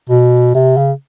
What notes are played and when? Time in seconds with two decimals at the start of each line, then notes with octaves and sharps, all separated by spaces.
0.10 B2
0.55 C3
0.77 C#3